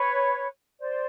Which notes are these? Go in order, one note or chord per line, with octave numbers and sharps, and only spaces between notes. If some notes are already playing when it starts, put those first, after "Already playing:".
Already playing: B4 C#5
C5 D5